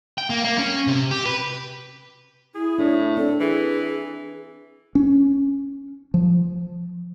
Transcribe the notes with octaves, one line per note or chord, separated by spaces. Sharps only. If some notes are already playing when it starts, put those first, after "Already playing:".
G5
A#3
A#3
C#4
C3
G4
B4
E4 G#4
A2 D4
C4 D4 A4
E3 G#4
C#4
F3